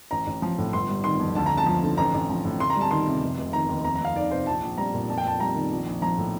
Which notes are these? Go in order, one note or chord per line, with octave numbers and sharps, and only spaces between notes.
A1 A#5
A1
F3
A2
G1 C6
G3
D#3 C6
F2
D2 A5
D2 A#5
A5
F3
D3
A1 A#5
A1
F3
A2
D2 C6
A#5
G3
A5
D#3 C6
C3
F1
F1
D#3 A#5
D#2
F2 A#5
A#5
F2 F5
D#3 D5
C3 C5
A#1 A5
A#1
G3 A#5
A#2
F2 A5
G5
F2 A5
G3 A#5
D#3
A#1
A#1
F3 A#5
A2